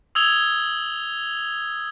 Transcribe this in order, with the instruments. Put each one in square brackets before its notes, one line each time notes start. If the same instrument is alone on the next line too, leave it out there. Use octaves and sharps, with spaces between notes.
[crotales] D#6 E6 G#6 F7 G7